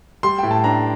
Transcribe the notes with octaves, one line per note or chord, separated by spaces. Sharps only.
G3 C6
A2 G5
A5
D4 A#5